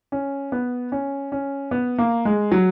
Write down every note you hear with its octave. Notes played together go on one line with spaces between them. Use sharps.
C#4
B3
C#4
C#4
B3
A#3
G#3
F#3